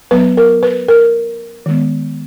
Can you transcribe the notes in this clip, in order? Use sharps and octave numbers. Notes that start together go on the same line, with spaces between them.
F#3 B3 B4
A#4
B4
A#4
D#3 G#3 B3